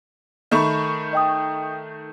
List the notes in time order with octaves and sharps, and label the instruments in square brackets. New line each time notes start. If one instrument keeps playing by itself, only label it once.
[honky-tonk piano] D#3 A3 C#6 [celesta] D#5 B5
[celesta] D#5 G5 D#6